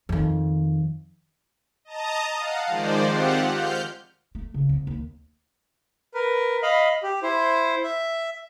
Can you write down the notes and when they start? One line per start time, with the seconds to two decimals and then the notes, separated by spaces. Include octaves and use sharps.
0.09 F2 D#3
1.85 D#5 A5 A#5 D#6
2.35 F5 F#5
2.67 D#3 F3 G#3 C5 D5
3.05 C4 F4 G4 F#5
3.49 F6 G6
4.35 A3
4.54 C#3
4.69 C2
4.87 D#2
6.14 A#4 B4
6.63 D#5 F5 B5
7.03 G4
7.23 E4 C5
7.83 E5